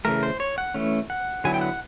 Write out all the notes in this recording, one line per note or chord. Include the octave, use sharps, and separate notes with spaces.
C#3 E3 A3 A#4
C5
C#5
F#5
E3 A3 C#4
F#5
D3 F#3 B3 E4 G#5
G5
F#5